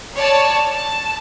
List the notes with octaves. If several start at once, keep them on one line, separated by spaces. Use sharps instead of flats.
C#5 D5 A5
A5